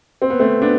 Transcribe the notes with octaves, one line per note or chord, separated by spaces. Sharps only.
C4
B3
A3 C4
B3 D4